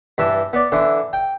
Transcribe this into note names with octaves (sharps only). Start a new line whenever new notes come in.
G2 E3 A5
B3 D5
D3 E3
G5